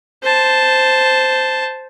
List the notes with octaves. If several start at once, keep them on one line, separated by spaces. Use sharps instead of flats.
C5 A5